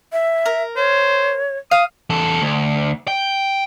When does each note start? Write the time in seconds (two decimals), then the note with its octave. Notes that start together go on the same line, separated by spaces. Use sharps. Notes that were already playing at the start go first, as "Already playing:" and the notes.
0.12 E5
0.46 A#4
0.77 C5 C#5
1.71 F5 D#6
2.10 E2 A4
2.41 D2
3.08 G5